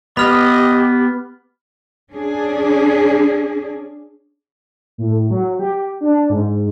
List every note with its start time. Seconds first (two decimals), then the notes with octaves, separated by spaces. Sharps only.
0.17 B3 G4 D#5 B5 F6
2.12 C#4 D4 G#4
4.98 A2
5.30 F#3
5.59 G4
6.01 D4
6.30 G#2